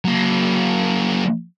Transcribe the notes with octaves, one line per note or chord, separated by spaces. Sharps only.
F#3 A#3